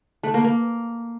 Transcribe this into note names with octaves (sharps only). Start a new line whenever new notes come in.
A3
A#3
A#3